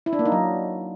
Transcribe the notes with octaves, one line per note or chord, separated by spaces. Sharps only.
E4
D4
A#3
D#4
F#3